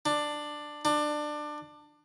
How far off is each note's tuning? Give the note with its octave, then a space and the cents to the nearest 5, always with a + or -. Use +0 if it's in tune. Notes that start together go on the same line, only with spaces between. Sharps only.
D4 +10
D4 +20